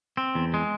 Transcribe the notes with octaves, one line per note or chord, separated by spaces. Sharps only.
C4
E2
G#3